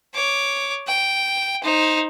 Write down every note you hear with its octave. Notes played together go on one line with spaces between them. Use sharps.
C#5 D6
G5
D#4 C5